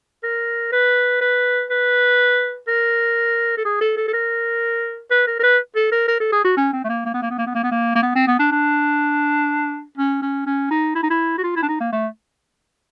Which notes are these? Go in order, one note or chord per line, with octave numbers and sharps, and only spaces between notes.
A#4
B4
B4
B4
A#4
A4
G#4
A4
A4
A4
A#4
B4
A#4
A#4
B4
A4
A#4
A#4
A4
G#4
F#4
C#4
C4
A3
A#3
A#3
B3
A#3
B3
A#3
B3
A#3
B3
A#3
A#3
B3
C4
B3
D4
D4
C#4
C#4
C#4
D#4
E4
D#4
E4
F#4
F4
E4
D4
D#4
A#3
A3